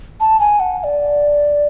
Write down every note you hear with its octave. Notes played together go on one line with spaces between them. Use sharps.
A5
G#5
F#5
F#5
D5